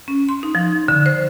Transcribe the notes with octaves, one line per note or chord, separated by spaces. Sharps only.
C#4
C6
D#4
F3
D3
C5